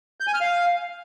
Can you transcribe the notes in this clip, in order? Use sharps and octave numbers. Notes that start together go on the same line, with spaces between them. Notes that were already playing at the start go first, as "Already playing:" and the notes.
G6
G#5
F6
F5